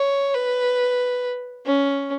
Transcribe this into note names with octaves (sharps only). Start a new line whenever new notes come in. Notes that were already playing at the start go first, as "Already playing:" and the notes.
Already playing: C#5
B4
C#4